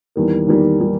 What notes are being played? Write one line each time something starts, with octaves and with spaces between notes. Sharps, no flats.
E2 D#3 G3 A#3
E2 D#3 G3 A#3
D#3 G3 A#3